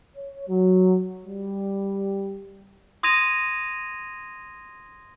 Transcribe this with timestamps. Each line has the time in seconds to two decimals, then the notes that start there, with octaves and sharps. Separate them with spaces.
0.17 C#5
0.48 F#3
1.25 G3
3.03 C6 D#6 G#6 A#6 D#7 F7